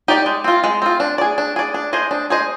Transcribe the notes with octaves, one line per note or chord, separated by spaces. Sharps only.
D#4 G4 D5
G#3
C4 F4
G#3
C4 F4
D4
G#4 D5
D4
G#4 D5
D4
G#4 C5 D#5
D4
G#4 C5 D#5